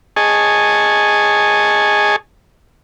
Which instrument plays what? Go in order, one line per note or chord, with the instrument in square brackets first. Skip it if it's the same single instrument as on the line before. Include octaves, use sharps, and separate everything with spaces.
[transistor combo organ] G#4 D#5 G#5 A5 C#6